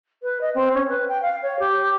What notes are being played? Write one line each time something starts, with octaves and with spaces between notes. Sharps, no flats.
B4
D#5
C4
C#4
B4
G5
F5
C#5
G4